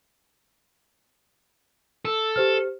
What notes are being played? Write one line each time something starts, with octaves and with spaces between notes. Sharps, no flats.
A4
G4 C5 F6